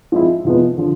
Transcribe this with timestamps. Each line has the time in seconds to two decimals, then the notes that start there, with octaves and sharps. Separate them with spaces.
0.12 F3 G#3 C4 E4
0.45 C3 F3 G#3 B3
0.78 D3 F3